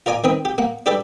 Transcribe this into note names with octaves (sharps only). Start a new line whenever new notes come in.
F4 A#4 D5 G#5 D6
D#3 C4 B4 D#6
G4
A#3 F#5
D4 G4 A4 B4 D5